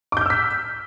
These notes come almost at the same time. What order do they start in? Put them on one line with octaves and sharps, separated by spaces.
D6 G6 F6 E6 B6